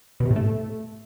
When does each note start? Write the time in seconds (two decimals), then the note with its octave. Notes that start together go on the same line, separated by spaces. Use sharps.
0.20 B2
0.25 C3
0.31 A2
0.36 A3